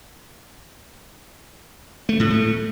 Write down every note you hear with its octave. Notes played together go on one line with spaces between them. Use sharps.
A3
A2
A3